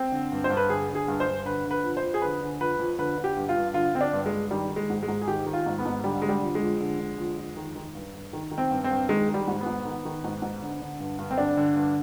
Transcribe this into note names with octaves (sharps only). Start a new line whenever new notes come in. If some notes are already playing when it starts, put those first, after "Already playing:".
Already playing: C4
D3
G2
C5
G2
B4
D3 G#4
D3
G#4
G2
C5
G2
D3 B4
D3
B4
F2
C5
F2
G#4
D3 B4
D3
F2 B4
F2
D3 B4
D3
G4
G2
F4
G2
D3 F4
D3 C4
D4
G2
G#3
G2
D#3 G3
D#3
G#3
G#2
G#3
G#2
G#4
D#3 G4
D#3
F4
G#2
B3
G#2
D3 G3
D3 G#3
G3
F2
G#3
F2
D3
D3
F2
F2
D#3
D#3
G2
G2
D#3
D#3
C4
G2
C4
G2
D#3 G#3
D#3
G3
G#2
B3
G#2
D#3
D#3
G#2
G#2
D3
D3
G2
G2
C4
D3 D4
D3
G2